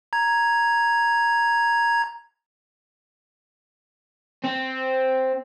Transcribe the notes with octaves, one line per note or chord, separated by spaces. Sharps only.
A#5 G#6
C4